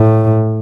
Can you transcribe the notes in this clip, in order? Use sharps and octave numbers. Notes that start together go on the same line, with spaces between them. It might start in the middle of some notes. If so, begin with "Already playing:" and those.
Already playing: A2